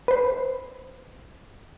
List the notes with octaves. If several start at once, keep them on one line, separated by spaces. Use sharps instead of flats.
B4 C5